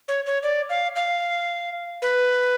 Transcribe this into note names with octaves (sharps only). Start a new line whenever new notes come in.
C#5
C#5
D5
F5
F5
B4